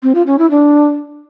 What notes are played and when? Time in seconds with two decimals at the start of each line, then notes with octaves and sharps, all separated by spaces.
0.03 C4
0.15 F4
0.27 C#4
0.39 E4
0.51 D4